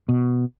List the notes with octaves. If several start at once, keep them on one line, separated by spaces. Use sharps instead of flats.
B2